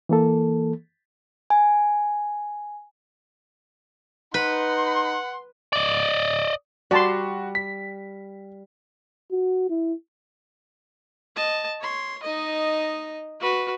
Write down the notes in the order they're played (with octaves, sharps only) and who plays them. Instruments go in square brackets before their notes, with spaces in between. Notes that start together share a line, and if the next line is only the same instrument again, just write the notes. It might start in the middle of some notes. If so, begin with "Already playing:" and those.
[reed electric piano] E3 A#3 A4
[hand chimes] G#5
[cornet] D#4 [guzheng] B4 [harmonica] F#5 [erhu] C6
[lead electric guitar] D5 D#5
[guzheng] G3 [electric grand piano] F#4 [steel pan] D5 A5 C6
[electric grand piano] B6
[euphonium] F#4
E4
[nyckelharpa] D#5 A5
C#5 C6
D#4 D#5
F#4 B4